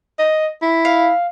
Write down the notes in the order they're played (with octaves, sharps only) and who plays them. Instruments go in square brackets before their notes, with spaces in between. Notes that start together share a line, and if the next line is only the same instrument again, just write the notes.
[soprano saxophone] D#5
E4
[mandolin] F5